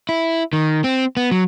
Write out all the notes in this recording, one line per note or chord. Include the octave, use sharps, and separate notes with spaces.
E4
D#3
C4
B3
F#3